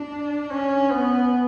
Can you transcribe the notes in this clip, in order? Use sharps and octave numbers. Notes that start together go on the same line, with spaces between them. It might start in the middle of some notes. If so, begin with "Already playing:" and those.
Already playing: D4
C#4
B3